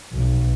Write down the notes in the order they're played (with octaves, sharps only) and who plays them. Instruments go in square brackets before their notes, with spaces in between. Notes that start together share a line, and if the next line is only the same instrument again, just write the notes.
[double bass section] B1